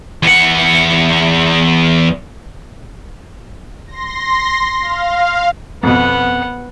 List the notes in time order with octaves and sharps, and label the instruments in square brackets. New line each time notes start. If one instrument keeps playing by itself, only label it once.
[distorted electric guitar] E2 F#5
[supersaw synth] C6 A#6
F5
[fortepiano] F2 B2 [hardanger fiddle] B3 F#5